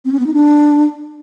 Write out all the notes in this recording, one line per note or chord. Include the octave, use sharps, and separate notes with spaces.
C4
C#4
B3
D#4
D4